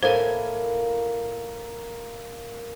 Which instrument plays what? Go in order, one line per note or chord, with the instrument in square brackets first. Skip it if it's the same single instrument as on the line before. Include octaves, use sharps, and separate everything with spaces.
[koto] A2 E4 G#5 [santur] A#3 [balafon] C5